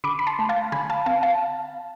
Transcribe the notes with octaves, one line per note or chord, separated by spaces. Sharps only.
D3 B5 D6
B5
A5 C6
A3
F5 A5
D3 G#5 B5
F5 A5
C4 F5 A5
F5 A5